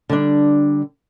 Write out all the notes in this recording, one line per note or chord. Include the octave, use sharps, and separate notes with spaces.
D3 G3 D4